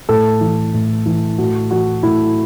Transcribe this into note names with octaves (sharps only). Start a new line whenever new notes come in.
A2 A4
E3
A2
E3
A2 F#4
E3 F#4
A2 E4